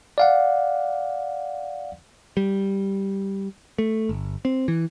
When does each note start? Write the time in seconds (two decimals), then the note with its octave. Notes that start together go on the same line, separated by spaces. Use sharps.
0.18 D5 F5 F#5
2.37 G3
3.78 A3
4.09 G1
4.45 C4
4.68 E3